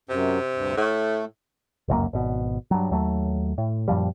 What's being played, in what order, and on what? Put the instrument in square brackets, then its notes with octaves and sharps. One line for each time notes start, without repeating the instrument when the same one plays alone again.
[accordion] F#2 [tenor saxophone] C3
[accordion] D2 G2
[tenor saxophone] A2 [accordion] A3
[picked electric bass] F1 C#2 F#2 A#3
G#1 B2
G2 F#3
D#2 F#3 A3
A2
F#2 A#2 F3 G3